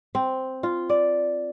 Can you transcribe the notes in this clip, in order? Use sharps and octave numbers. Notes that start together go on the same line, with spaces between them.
C4
F4
D5